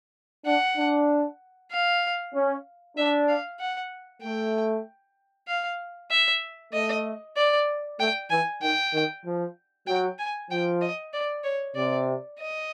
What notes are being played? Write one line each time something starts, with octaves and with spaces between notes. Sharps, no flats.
D4 F#5
D4
F5
C#4
D4 E5
F5
F#5
A3 G5
F5
E5
A3 D#5
D5
A3 G5
E3 G#5
D#3 G5
D#3
F3
F#3 G5
G#5
F3 G5
D#5
D5
C#5
C3 D5
D#5